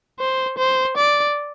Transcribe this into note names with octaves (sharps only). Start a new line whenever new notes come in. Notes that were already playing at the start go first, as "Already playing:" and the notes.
C5
C5
D5